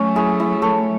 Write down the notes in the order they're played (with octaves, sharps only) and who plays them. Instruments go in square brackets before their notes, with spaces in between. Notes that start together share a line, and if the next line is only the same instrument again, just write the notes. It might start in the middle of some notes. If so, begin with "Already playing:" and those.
Already playing: [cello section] F#3 A3 [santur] C#4
[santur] E4 G#4 C#5
E4
A4 C#5